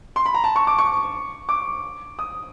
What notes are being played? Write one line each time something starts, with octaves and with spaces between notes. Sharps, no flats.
C6
B5
A#5
A5
C#6
D6
C#6
D6
D#6